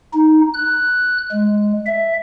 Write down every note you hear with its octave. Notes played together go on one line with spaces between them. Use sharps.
D#4
F#6
G#3
E5